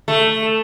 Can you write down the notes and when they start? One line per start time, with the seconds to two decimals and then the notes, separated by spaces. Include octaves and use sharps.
0.08 A3